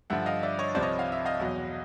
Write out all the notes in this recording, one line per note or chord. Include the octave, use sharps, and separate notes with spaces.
G2 D3 F3 E5 F#5
D#5 F5
D5 E5
C#5 D#5
C2 C3 F3 C5 D5
C#5 D#5
F5
E5
D#5 F5
E2 B2 F#3